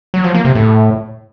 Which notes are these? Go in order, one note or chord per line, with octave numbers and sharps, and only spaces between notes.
F#3
F3
A#3
C3
A2